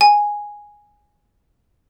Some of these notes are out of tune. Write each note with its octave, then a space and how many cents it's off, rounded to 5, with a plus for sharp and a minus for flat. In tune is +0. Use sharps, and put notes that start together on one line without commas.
G#5 -5